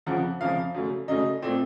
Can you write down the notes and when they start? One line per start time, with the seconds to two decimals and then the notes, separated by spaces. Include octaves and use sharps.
0.06 F2 C#3 F3 F#5
0.41 F2 C#3 F3 F5
0.74 F#2 C#3 A3
1.08 F#2 C#3 A3 D#5
1.42 A#2 A3 C4